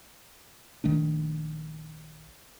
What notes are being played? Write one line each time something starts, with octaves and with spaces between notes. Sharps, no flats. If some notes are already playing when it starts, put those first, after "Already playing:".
A#1 D#3 A3 D4